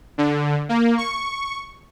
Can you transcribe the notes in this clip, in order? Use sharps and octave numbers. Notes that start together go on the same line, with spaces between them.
D3
A#3
C#6